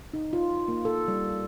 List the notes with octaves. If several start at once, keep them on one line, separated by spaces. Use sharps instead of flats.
D#4
F4
A#3
A4
G3